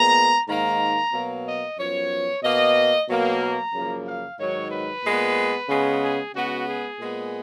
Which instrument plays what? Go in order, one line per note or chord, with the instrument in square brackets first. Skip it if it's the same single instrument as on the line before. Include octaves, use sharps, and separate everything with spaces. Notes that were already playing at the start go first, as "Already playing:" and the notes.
Already playing: [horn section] A#2 G#3 B3 A#5
G#2 D#3 A#3 A#5
B2 F#3 A#3
D#5
F#2 F3 B3 C#5
B2 A#3 D#5
B2 F#3 A#3
A#5
F#2 C#3 F3 A#3
F5
G#2 D#3 F#3 C#5
B4
A#2 G#3 B3
C#3 G#3 B3
G#4
C#3 G#3 B3 F#4
G#4
A#2 G#3 B3